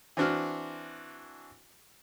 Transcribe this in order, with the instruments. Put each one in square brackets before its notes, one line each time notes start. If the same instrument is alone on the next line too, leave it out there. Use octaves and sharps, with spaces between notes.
[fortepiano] E3 C4 D4 F#4 F6